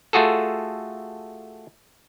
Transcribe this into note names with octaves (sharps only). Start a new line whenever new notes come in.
A3 F4 F#4 G#4 A4